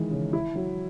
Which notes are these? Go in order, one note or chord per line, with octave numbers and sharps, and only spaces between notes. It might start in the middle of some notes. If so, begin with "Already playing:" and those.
Already playing: D#3 E3 G#3
C#3
E4
F#3